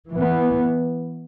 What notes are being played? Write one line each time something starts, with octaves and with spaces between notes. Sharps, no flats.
E3 B3